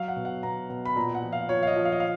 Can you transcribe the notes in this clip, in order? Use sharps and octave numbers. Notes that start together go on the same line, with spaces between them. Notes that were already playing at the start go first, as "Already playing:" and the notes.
Already playing: F#3 F5
F#5
B2
F#5
B2 A#5
B2
B5
A#2 A#5
F#5
F3
F5
F3 C#5
F5
D#5
F3
F5
D#5
F5